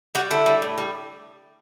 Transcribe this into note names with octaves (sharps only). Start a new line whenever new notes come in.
G3 F#4
D3 E4
G3
A2
G3